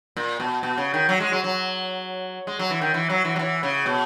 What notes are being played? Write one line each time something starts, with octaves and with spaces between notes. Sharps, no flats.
A#2
B2
B2
C#3
D#3
F#3
G#3
F#3
F#3
G#3
F#3
E3
D#3
E3
F#3
E3
F#3
E3
C#3
B2